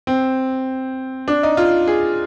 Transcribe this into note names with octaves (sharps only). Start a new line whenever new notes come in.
C4
D4
D#4
F4
G#4